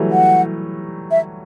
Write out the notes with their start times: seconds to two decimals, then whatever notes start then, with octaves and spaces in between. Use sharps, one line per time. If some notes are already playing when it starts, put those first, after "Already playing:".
Already playing: E3 F#3 G3 A3
0.11 F#5
1.11 E5